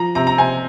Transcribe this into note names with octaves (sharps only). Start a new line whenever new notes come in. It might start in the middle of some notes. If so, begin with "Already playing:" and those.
Already playing: F3 A#5
C3 A#5
A#5
C3 G#5